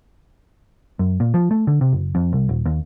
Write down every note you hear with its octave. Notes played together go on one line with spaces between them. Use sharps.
F#2
A#2
F3
A3
D3
C3
F#1
F2
C2
D#1
D#2